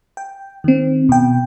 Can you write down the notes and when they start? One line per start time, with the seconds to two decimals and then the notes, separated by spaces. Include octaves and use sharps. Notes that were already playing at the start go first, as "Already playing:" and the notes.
0.17 G5
0.64 D#3 C4
1.09 B2 G5